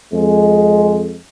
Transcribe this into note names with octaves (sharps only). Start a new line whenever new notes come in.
F2 G#3